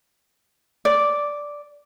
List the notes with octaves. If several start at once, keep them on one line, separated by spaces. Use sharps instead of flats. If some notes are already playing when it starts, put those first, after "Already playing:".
D5